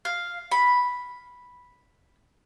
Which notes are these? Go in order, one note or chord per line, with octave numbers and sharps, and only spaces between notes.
F5
B5